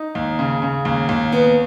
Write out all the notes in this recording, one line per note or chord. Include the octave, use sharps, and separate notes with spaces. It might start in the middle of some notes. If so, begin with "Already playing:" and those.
Already playing: D#4
D#2
C#3
C#3
D#2
D#2
B3